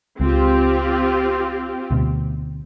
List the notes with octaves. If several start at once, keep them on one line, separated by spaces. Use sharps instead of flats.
C#2 G#3 C4 F4 G4
D2 B2